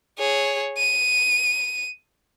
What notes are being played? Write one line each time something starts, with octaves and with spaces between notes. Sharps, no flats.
G#4 C#5
D#7